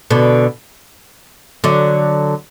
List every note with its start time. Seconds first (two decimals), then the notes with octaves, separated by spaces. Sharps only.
0.10 B2 D3
1.64 D3 F#3